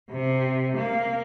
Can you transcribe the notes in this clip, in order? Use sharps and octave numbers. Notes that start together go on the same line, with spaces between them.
C3
A#3